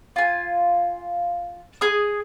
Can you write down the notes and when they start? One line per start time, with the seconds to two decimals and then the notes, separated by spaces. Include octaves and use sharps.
0.16 F4 G#5
1.81 G#4 D#6